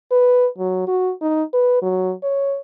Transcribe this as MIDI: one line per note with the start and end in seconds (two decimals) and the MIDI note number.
0.12 0.47 71
0.58 0.85 54
0.87 1.12 66
1.22 1.43 63
1.53 1.81 71
1.82 2.13 54
2.23 2.60 73